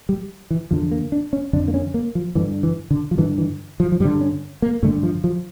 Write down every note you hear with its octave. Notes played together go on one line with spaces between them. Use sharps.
G3
E3
E2 D3 F3
A#3
D4
C#4
F2 D3 D4
A#3
C#4
A#3
F3
G2 D3 E3
E3
D3
F3
G2 D3 E3
E3
F3
F3
G2 D3 G3
C#4
A#3
G2 D3 A3
F3
F3